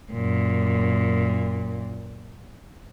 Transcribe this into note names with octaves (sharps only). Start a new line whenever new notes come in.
F#2 A#2